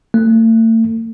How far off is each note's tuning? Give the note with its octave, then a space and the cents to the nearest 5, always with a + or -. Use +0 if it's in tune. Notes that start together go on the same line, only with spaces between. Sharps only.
A3 +40